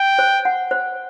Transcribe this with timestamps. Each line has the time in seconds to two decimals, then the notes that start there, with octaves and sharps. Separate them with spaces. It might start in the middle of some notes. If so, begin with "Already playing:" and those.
Already playing: G5
0.19 C5
0.45 F#5
0.71 C5